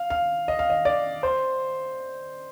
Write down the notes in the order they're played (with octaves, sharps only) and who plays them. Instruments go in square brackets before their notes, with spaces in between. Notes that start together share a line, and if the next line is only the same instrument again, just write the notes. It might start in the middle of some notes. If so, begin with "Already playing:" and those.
Already playing: [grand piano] F5
F5
D#5
F5
D#5
D5
C5